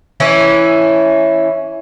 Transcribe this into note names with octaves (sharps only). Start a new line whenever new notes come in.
E3 C#4 E4